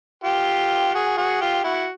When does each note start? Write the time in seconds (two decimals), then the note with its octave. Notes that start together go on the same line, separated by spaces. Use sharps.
0.24 F4 G4
0.94 F#4 G#4
1.17 F#4 G#4
1.41 F4 G4
1.64 E4 F#4